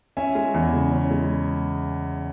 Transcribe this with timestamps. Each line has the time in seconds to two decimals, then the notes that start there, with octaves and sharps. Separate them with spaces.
0.17 C#4 E5 G#5
0.35 G#3
0.54 E2
0.73 C#3
0.92 C#4
1.11 G#3